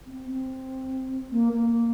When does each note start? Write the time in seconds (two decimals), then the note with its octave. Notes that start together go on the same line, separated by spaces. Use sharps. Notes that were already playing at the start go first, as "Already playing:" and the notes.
0.06 C4
0.27 C4
1.31 A#3
1.53 A#3